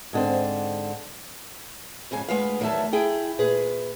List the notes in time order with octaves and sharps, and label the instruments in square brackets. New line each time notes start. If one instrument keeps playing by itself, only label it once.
[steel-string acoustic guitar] G#2 D3 C4
F2 G#2 C#3 G#5
D2 G#3 B3 B4 F5
E2 D#3 F#3 A3 E5 A5
E4 G#4 G5
A#2 G#4 B4